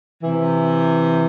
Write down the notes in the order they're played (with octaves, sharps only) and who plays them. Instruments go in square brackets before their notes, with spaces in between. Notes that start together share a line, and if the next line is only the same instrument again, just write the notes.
[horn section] C3 E3